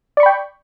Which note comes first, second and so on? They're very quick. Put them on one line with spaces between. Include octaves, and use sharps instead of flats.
D5 C#6 B5 G5